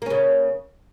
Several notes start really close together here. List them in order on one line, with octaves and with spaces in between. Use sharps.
A#3 C#4 C#3